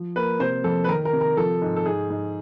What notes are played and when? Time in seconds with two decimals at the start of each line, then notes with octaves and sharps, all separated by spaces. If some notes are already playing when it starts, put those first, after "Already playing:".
Already playing: F3
0.16 A#3 B4
0.40 C3 C5
0.64 F2 A4
0.84 B4
0.89 D#3 A#4
1.05 A#4
1.13 C3
1.21 A#4
1.37 F3 A4
1.62 G#2
1.76 A4
1.86 G#2 G#4
2.10 G#2